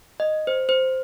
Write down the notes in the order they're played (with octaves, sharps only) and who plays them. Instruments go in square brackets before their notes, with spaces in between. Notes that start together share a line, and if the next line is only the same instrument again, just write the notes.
[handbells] D#5
C5
C5